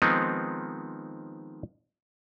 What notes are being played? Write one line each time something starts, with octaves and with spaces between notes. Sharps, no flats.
D#3 F3 G#3 B3 C4 D#4